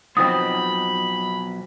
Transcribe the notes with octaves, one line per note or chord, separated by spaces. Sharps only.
B1 B2 F3 C4 B5 D#6